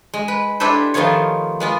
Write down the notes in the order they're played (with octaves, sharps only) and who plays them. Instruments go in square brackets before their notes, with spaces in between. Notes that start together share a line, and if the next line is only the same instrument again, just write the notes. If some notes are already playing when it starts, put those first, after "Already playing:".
[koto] G#3
B4
D4 E4 G4 A4 B4 C5
D#3 F3 A3 B3 F4 C#5
G#3 B3 F4